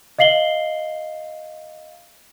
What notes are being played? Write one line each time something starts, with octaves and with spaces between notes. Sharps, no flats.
D#5 F5 C7 F#7 G7